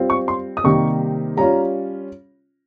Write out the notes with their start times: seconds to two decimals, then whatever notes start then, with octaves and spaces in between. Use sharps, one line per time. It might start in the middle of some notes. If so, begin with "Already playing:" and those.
Already playing: G3 C4 F4
0.10 C#6
0.28 C6
0.57 D#6
0.64 C3 D#3 G3 A#3 D#4 C#6
1.37 G3 C#4 F4 A#5